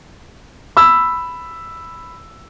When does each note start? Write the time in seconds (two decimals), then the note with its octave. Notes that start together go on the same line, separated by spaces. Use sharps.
0.77 B5 E6